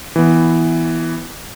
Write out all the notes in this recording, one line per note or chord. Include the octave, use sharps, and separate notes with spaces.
E3 B3